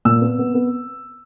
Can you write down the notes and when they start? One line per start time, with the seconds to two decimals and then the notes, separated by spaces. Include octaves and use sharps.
0.05 A#2 E6
0.21 B3
0.38 B3
0.54 B3